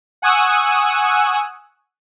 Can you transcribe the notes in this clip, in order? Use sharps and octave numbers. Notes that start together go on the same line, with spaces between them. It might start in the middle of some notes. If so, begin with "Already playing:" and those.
F#5 G#5 C#6 D#6 E6 F#6